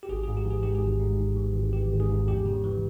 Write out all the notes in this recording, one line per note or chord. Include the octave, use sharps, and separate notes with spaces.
G4
G#1 G#4
G#2 G#4
G4
E3 G#4
G#2 G4
G#4
G#1
G#2
G#2
E3
G#1
E3 G4
G#1
G#4
G#2
E2 G4
C#3
E3